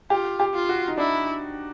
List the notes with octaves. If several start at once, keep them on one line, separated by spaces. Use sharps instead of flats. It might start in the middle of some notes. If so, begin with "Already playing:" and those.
F4 G4
G4
F4
F#4
D#4
D4 E4